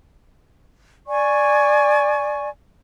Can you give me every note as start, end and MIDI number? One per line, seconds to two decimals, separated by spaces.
1.07 2.49 74
1.07 2.49 80
1.07 2.49 85